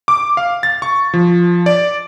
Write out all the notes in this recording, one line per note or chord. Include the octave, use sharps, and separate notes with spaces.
D6
F5
A6
C#6
F3
D5